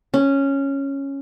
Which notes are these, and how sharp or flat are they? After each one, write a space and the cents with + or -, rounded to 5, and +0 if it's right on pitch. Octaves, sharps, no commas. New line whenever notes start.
C#4 -5